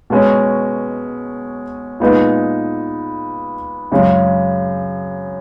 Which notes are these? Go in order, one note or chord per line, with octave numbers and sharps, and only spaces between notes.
B2 G#3 C#4
A#2 G#3 B3 D#4
F#2 C#3 G#3